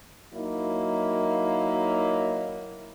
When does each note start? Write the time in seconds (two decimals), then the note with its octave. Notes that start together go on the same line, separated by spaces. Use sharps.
0.34 F#3 A#3 D#4 E4